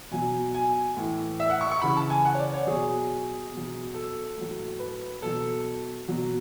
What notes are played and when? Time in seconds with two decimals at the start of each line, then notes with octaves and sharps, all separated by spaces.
0.11 B2 F#3 G#5
0.54 G#5
0.97 A2 E3
1.40 E5
1.50 F#5
1.61 C#6
1.71 C#6
1.81 C#3 E3 B5
1.97 A5
2.10 G#5
2.25 F#5
2.35 C#5
2.39 D5
2.53 C#5
2.67 B2 F#3 G#4
3.52 B2 F#3
3.94 A4
4.37 A2 F#3
4.79 B4
5.22 B2 F#3 A4
6.08 B2 F#3